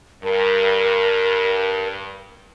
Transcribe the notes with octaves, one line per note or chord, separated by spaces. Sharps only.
G2 A#4